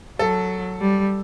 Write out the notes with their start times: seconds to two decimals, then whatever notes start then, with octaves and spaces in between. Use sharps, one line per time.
0.19 F#3 A4
0.81 G3